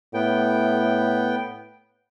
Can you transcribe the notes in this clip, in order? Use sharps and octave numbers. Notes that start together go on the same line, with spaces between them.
A2 B3 G5